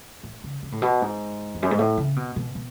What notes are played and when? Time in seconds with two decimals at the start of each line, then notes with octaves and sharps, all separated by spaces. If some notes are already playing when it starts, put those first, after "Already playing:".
0.23 A2
0.44 C#3
0.63 C#3
0.72 A2
0.82 B2
1.02 G#2
1.55 E2
1.62 F#2
1.71 G#2
1.79 A2
1.97 C#3
2.16 B2
2.36 B2
2.55 B2